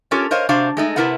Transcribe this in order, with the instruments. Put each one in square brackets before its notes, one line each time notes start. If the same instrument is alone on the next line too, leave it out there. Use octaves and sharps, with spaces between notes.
[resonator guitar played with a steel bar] C#4 F4 G4 A4 A#4 C#5
A#4 C5 C#5 D#5 F5
C3 D4 F#4 C5 F5
G#3 A3 D#4
C3 F3 E4 A#4 B4 F#5